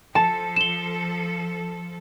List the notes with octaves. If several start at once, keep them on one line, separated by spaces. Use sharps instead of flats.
F3 A4 A5
E7 G7